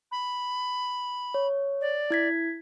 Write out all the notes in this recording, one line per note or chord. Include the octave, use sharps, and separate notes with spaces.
B5
C#5
D5
E4 G#6 B6